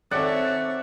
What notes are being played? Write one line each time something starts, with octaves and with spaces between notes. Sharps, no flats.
G#1 C4 A4 C#5 D5 E5 F#5